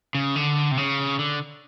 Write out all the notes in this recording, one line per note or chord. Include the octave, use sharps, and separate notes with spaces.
C#3
D3
C3
C#3
D3